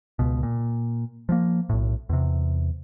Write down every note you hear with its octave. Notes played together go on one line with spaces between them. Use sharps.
C#2 B2
A#2
F3 G#3 A#3
B1 A2
E2 C3